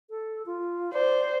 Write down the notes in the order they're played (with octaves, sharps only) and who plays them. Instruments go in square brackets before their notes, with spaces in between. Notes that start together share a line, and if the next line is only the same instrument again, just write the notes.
[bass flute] A4
F4
[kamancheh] C5 [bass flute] D5